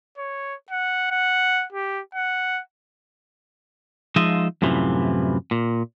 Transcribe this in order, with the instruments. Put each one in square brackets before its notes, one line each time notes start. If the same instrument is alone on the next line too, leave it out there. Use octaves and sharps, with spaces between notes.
[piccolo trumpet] C#5
F#5
F#5
G4
F#5
[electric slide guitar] F3 G#3 D#4 F4 D#5 E5
F#2 A2 C3 E3 F3
A#2